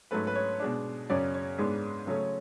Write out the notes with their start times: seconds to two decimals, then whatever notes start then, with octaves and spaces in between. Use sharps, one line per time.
0.11 G#2 F#3 A3 C#4 B4
0.27 B4
0.36 C#5
0.59 B2 G#3 D4
1.10 F#2 C#3 F#3 C#4 D5
1.34 C#5
1.58 G#2 G#3 B3 D4
2.07 C#3 F#3 A3 C#4